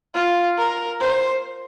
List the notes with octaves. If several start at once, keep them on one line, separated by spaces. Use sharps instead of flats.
F4
A#4
C5